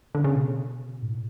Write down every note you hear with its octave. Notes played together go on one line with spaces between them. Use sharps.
D3
C#3
B2
G#2
A2